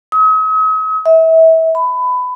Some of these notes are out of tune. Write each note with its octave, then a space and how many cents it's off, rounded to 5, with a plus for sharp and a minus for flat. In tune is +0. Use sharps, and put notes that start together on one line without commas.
D#6 +45
E5 -30
B5 +20